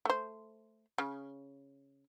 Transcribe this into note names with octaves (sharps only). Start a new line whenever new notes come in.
A3 C5
C#3